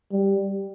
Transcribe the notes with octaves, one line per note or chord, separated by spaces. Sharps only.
G3